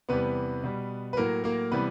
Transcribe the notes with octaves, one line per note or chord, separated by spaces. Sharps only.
E2 C3 E3 G3 B3 B4
B2 G3
B4
A2 F#3 A#3 A#4
A#3 A#4
C3 E3 G3 B3 B4